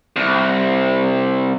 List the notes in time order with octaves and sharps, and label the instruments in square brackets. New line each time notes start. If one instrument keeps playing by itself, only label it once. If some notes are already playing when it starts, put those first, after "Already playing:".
[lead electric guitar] C2